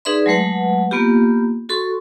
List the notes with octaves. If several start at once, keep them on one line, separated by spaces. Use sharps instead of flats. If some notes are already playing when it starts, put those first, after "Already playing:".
D#4 G#4 B4 D5 E5 C6
F#3 G#3 A3 B4 F#5
A#3 B3 F4 G4
F#4 A4 C6 C#6